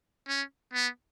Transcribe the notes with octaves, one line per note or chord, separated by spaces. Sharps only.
C#4
B3